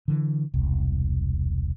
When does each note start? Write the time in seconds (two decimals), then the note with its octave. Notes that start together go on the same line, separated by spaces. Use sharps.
0.08 D3 E3
0.54 E1 C2